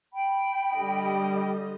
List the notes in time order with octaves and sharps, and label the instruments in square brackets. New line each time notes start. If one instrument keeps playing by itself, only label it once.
[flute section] G5 B5
[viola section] D3 G3 D#5